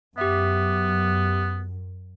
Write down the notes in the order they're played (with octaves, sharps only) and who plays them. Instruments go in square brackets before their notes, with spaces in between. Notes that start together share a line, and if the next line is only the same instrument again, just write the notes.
[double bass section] F#2 [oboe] B3 [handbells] G4 E5